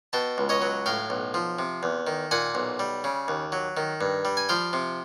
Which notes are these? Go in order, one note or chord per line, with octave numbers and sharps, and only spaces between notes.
B2 G5 A5
C#2
C#5 D#5
F#3
A2 F5 G5
B1
F3
C3
E2
D#3
A#2 F#5 G#5
B1
G3
C#3
D#2
F#3
D#3
G2
G3
G#5
F3 F5 G5
C3